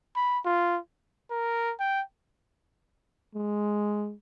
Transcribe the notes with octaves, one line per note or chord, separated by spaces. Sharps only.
B5
F4
A#4
G5
G#3